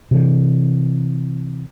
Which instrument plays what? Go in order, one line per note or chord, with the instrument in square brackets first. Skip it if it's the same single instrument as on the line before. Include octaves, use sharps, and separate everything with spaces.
[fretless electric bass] C3 E3